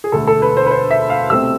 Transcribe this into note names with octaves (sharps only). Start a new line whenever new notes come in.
G#4
E1 D2 D3 A3 A4
A4
B4
C5
B4
C5
E5
F5
C2 B2 A3 C4 E6